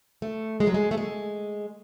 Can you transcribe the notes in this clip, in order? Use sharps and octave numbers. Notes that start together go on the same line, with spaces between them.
A3
G#3
F#3
G#3
A3
G#3